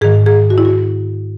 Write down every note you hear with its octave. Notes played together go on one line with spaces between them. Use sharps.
G#2 D#3 G#4
G#4
F#4
E4
F#4